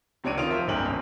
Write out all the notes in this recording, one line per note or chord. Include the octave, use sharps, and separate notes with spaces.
C#2 C3 D4 C#5 D7 D#7
D#3 F4 D#6 D7 F7
F3 C5 E5
G1 C2 G#2 C#4 G5 F#7
G#1